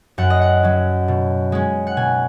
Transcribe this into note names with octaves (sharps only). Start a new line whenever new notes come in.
F#2 F#5
D#5
F#5
F#3 C#4
B2
G#3 C#4
F#5
B2 G#5